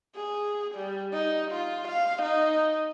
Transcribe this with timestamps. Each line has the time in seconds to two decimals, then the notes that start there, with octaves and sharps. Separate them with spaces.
0.16 G#4
0.74 G3
1.13 D#4
1.51 F4
1.87 F5
2.22 D#4